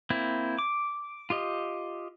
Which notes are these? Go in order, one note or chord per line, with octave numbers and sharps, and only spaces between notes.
A#3 C4 E4
D6
F4 G4 D#5